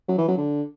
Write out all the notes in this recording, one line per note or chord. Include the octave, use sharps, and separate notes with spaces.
F#3
E3
F#3
D3